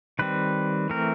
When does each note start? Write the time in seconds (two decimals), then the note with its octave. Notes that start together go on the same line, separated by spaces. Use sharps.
0.19 D#3 G3 C4 B4
0.90 E3 A3 C4 A#4